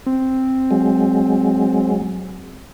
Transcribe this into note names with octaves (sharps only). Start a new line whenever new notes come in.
C4
F#3 G#3